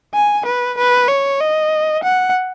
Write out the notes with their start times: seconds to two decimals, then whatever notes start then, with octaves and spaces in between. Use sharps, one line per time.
0.14 G#5
0.46 B4
0.78 B4
1.09 C#5
1.40 D#5
2.03 F#5